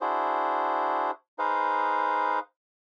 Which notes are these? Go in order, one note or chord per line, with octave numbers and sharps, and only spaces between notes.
D4 E4 F#4 G#4 C5
D#4 G#4 B4 C5 F5